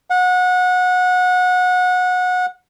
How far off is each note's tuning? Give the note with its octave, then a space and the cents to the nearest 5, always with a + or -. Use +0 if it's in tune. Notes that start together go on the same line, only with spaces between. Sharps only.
F#5 -25